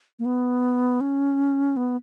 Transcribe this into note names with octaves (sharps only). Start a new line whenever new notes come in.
A#3
B3
C#4
B3